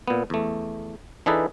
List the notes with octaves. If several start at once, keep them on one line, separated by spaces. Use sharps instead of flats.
A#2 B3
E2 A3
E3 D4 D#4 G#4 A4 B4